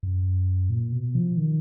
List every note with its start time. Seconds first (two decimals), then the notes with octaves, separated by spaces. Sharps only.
0.03 F#2
0.70 A#2
0.92 B2
1.15 F3
1.37 D#3